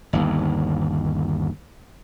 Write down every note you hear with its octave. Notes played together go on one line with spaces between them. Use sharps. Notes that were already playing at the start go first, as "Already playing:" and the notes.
G1 D#2